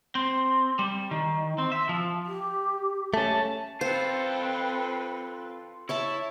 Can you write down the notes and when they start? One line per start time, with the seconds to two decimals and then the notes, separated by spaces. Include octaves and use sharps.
0.15 C4
0.79 G3
1.11 D#3
1.58 C4
1.72 E5
1.89 F3
2.26 G4
3.14 A3 C#4 A5
3.81 C4 F4 A4 B4 C5
5.89 E4 C#5 E5 A5